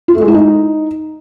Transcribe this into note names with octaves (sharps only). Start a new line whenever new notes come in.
F4
A3
G#3
E4
D#4